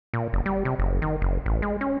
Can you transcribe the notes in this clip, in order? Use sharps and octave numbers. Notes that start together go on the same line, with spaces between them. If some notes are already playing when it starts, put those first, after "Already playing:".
A#2
F#1
G3
C3
F#1
D#3
F#1
A1
G#3
C#4